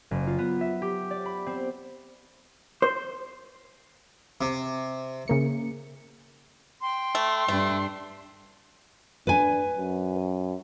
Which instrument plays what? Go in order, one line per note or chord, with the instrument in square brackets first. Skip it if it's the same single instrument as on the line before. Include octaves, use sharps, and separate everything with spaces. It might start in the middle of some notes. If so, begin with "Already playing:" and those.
[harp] F#1
F4
B3
E5
G4
D5
B5
C4
[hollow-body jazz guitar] C5
[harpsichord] C3
[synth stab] C#3 A#3 C#7
[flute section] G5 C6
[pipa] A3
[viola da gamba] G2 D4 [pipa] A3
[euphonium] D4 [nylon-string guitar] B4 G#5
[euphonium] F#2